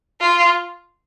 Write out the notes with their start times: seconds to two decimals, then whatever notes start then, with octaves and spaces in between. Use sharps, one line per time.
0.21 F4